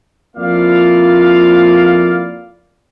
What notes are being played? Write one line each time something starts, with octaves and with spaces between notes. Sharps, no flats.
F2 A#3 E4 F4 D5 F5